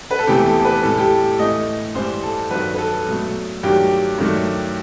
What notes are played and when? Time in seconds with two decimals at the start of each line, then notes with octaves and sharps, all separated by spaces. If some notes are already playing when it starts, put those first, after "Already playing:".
0.11 B4
0.19 A4
0.27 E2 C3 E3 A3 G4
0.46 A4
0.60 A4
0.65 B4
0.83 A2 G3 A4
0.98 G4
1.01 A4
1.39 A2 E3 A3 D#5
1.95 G2 E3 G3 C5
2.23 A4
2.51 G2 D#3 F#3 B4
2.74 B4
2.78 A4
3.07 B2 F#3 A3
3.63 G2 D#3 F#3 A3 G4
4.18 G2 D#3 F#3 A3